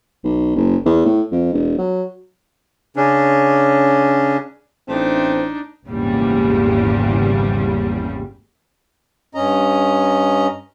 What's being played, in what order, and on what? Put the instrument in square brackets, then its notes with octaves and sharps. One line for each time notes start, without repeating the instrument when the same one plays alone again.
[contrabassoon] B1
F#1
E2
A2
F2
E1
F#3
[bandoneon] C#3 C#4 D4
[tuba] A1 [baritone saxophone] A3 [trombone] C4 [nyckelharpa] D4 D#4
[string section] G#1 E2 A#2 C#3 G3
[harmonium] G2 C#4 D#5 A#5